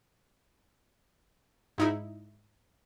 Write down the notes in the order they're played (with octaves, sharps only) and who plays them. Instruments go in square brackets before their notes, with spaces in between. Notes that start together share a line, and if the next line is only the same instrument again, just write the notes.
[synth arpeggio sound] G#2 D#4 E4